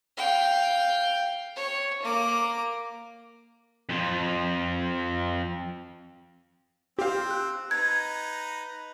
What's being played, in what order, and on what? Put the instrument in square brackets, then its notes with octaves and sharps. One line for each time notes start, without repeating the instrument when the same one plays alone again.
[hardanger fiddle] F5 G5
C#5
A#3 D6
[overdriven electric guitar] F2 F3
[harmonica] C4 [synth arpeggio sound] G4 F5
[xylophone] F#6
[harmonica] D#4 B4 A#5 [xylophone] G#6